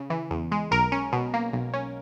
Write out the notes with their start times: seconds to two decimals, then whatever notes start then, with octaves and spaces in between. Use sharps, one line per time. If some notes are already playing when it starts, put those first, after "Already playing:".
Already playing: C#3
0.10 E3
0.31 E2
0.52 G#3
0.71 B1 A#4
0.92 C#4
1.13 B2
1.34 A#3
1.53 B1
1.74 C#4